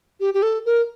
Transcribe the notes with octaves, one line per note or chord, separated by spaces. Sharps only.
G4
G4
A4
A#4